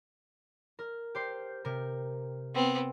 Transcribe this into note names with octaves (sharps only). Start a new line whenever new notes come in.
A#4
G4 C5 C6
C3 A#4
B3 C4